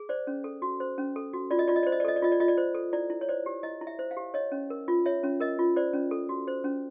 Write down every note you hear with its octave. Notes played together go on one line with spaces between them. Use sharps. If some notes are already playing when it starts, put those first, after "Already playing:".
Already playing: G#4
C5 D5
C#4
A4
F#4
C5
C#4
A4
F#4
F4 D5
D#5
F4 D5
D#5
D5
C5
D#5
D5
A4 D#5
D5
F4 D#5
D5
F4 D#5
D5
C5
A4
E4 D5
E4
C#5
C5 D5
G4
E4 D#5
E4
E5
C5
F5
G4
C#5 D#5
C#4
A#4
F4
C#5 E5
C#4
A#4 D#5
F4
C5 D5
C#4
A4
F#4
C5
C#4